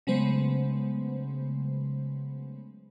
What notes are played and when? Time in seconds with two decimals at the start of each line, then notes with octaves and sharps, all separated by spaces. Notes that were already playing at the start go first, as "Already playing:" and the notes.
0.07 C#3 F#3 G#3 A3 B3 C5